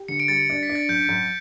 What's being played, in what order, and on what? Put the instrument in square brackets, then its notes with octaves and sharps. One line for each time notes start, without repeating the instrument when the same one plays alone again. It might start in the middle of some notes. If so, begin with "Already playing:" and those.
Already playing: [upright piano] G4
[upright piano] D3 [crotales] C#7
[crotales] D7
[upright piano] G3 [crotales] A6 C#7
[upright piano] D4
[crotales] B6
[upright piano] D4
[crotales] A6
[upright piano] F#2 [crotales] G6
[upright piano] F#2